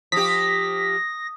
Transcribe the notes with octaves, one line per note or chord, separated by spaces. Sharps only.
F3 G4 D#6 A#6 B6